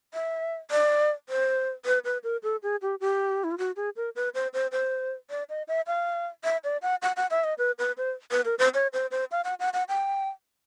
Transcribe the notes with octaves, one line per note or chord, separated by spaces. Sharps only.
E5
D5
C5
B4
B4
A#4
A4
G#4
G4
G4
E4
F4
F#4
G#4
A#4
B4
C5
C5
C5
D5
D#5
E5
F5
E5
D5
F#5
F#5
F#5
E5
D#5
B4
B4
C5
B4
A#4
C5
C#5
C5
C5
F5
F#5
F#5
F#5
G5